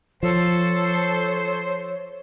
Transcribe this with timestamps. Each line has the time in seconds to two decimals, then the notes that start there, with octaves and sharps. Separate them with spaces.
0.23 F3 A4 C5 C#5